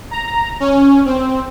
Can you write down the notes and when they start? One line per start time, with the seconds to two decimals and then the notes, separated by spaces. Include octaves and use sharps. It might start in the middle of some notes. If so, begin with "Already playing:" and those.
0.11 A#5
0.60 C#4
1.05 C4